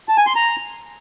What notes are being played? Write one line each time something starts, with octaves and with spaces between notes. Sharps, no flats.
A5
G#5
C6
A#5